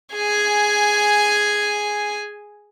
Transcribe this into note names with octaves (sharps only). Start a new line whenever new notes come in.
G#4 G#5